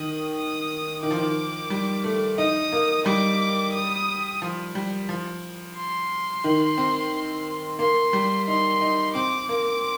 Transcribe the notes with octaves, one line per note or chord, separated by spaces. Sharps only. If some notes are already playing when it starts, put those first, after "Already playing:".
Already playing: D#3 D#6
D#6
D#3 D6
F3
D#3
G3
A3
D#4 D#6
A#3
G3 D6
D#6
F3
G3
F3
C6
D#3
C4
A#3 C6
G3
D#4 C6
D#4
C4 D6
A#3